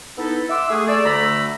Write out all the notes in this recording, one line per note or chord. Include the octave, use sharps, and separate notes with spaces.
B3 D#4 E4 A4
E5 F#5 C6 D6 E6
A3 G#4
A3 D5 E6
D2 D3 A3 A#5 B5 E6